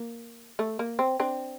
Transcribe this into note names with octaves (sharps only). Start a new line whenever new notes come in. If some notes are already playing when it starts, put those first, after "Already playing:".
Already playing: A#3
A3
A#3
C4
C4 D4